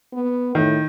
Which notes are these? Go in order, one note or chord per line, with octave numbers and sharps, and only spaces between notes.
B3
A2 D#3